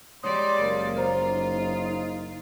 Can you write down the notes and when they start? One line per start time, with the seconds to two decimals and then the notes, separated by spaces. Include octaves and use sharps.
0.23 G3 G#3 C#5 D5 C6 D#6
0.59 F#1 A#3
0.96 F4 C5 A#5
1.27 D#4